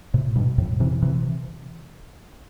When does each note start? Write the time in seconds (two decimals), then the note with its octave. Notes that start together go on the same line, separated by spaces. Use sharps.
0.14 A2 C3
0.36 G2 B2
0.58 F2 A2
0.80 C3 E3
1.02 C3 E3